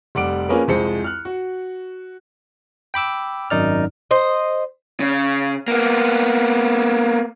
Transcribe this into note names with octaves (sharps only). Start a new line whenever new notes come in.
F1 G3 F#5 D6 D7
F3 A#3 C#4 G#4 A#4 B4
C2 F2 G#3 C5 C#7
F6 F#6
F#4
G5 B5 D6 E6
G#1 F#2 D#4 D5 F6
C5 D#5
C#3
A#3 B3